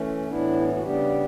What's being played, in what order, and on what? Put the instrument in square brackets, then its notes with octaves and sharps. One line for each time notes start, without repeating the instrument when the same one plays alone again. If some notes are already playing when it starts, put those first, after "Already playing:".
Already playing: [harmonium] E3 A3 C#4
A2 E3 B3 D4 E4
D4
E4
F#4
C#3 G3 B3 D4 G4